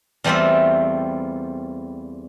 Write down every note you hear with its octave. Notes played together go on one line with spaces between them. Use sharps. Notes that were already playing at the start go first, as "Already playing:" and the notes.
E2 G3 A3 C4 F4 E5